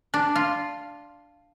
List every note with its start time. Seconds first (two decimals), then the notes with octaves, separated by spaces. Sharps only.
0.14 D4
0.36 F4